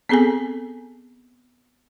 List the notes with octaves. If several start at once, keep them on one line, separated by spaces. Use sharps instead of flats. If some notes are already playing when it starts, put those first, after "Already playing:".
B3 C4 G#4 A4 G#5